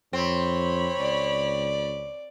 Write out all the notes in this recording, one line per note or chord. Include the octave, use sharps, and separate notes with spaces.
F2 C4 C#5 B5
C#2 D5